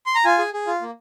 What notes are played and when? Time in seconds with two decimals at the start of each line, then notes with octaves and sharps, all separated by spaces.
0.06 C6
0.15 A#5
0.25 F4 G#5
0.38 G#4
0.53 G#4
0.67 F4
0.82 A#3